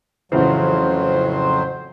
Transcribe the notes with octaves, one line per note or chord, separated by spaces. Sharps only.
F2 A2 C#3 E3 F#3 C5